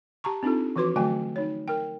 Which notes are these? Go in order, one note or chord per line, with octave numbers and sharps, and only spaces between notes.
G4 A5 A#5 C#6
C4 D4 D#4 F4 A4
E3 F3 F#4 B4 C6 D6
D3 F#3 A3 F#4 G5 G#5
D#4 C#5
A#4 G5